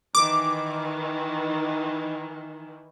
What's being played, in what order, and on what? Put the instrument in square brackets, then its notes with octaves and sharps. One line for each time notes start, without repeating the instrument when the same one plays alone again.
[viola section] D#3 E3 [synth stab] D6